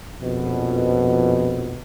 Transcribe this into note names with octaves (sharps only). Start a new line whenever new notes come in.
A#1 F2 B2